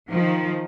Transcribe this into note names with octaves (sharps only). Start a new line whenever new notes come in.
D#3 F3